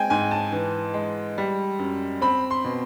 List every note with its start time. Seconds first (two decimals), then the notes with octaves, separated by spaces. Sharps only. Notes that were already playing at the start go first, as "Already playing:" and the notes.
Already playing: G#3 C4 G5 G#5
0.10 G#2 G#5
0.31 A5
0.52 E3
0.94 G#3
1.38 G3
1.79 F#2
2.22 C4 B5
2.51 C6
2.65 B2